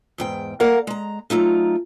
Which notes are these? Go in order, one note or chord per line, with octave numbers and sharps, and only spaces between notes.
E2 G#2 G5
A3 A#3 A#4 D5 F5 F#5
G#3 A#5
F#3 A3 D#4 F4